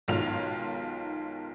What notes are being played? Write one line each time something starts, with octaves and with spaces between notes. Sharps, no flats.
B1 D#3 G#3 F4 F5 F7